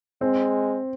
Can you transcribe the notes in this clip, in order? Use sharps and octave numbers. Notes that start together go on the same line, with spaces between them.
G#3 C4